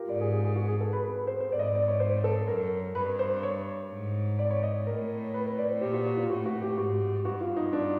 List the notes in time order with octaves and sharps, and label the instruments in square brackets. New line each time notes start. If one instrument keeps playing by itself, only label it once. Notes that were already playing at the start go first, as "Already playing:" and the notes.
Already playing: [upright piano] F4 G4 A#4
[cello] G#2 [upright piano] D5
[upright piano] G#4
G#4
G#4
F#4
G#4
A4
B4
B4
B4
C5
C5
[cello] G#2 [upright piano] D5
[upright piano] D#5
D5
D5
C#5
C5
A4
[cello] F#2 [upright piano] A#4
[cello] G2 [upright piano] B4
[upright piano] C5
C#5
[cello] G#2
[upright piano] D5
C#5
D#5
[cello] A2 [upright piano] A#4
[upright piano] B4
B4
D5
C5
[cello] A#2 [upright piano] G4
[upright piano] F#4
F#4
F4
[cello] A2 [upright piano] F#4
[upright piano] F#4
G4
[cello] G#2 [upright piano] F#4
[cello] G2 [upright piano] F#4
[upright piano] F4
D#4
D4